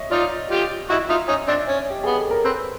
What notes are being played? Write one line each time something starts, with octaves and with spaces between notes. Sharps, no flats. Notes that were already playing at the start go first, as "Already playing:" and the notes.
Already playing: C#5 D#5 E5
D#4 F4 D5
F4 G4
E4 F#4 D#5
D#4 F4 E5
C#4 D#4 D#5
C4 D4 D5
C#4 C#5
G4
B3 G#4
A4
A#4
C4 B4